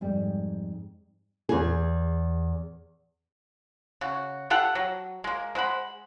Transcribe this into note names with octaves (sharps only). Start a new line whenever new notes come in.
F2 G#2 G3
E2 G#4
C#3 F#4
G4 A4 F5 F#5
F#3
G#3 A#3
G#3 C5 F#5 B5